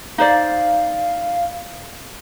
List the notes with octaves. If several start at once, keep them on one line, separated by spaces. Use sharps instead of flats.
D#4 C5 D5 F5